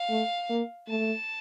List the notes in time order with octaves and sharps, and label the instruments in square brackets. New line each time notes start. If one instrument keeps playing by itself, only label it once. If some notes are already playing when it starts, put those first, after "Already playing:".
Already playing: [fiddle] F5
[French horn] A3
A#3
[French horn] A3 [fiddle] A5